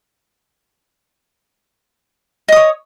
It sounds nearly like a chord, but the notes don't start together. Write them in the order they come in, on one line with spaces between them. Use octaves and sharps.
D#5 D#6 C#5